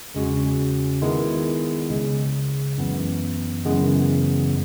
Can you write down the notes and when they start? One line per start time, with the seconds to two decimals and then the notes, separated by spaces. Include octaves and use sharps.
0.15 E2 C#3 G#3 C#4 F#4
1.02 D#3 G#3 B3 E4
1.90 C#2 C#3 G#3
2.78 F#2 E3 B3
3.65 F#2 C#3 E3 G#3 B3